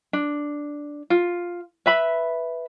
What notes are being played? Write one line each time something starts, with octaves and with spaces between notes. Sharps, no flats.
D4
F4
B4 E5 B5